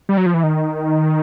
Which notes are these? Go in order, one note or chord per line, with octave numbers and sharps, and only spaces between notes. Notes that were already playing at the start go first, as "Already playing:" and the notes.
G3
F#3
F3
E3
D#3